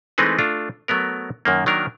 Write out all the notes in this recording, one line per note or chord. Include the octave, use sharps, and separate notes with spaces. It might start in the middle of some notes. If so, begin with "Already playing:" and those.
E3 G#3 A3 C4 D#4 B4
A3 D4 F4
F#3 A3 B3 A#4
F#2 D#3 A#3
D#3 F#3 A#3 D4 A#4